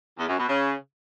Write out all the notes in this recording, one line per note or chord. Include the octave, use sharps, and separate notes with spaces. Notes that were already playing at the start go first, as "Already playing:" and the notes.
E2
F#2
B2
C#3